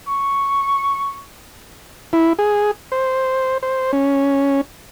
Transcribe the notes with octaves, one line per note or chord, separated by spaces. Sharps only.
C#6
E4
G#4
C5
C5
C#4